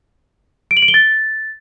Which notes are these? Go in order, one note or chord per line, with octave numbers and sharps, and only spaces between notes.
D7
F#7
D7
G7
A6